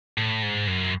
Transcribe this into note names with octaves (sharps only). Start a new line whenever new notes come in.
A2
G#2
F#2